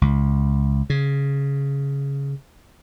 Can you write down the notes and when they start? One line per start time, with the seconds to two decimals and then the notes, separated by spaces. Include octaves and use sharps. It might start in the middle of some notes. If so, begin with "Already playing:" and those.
0.01 C#2
0.90 C#3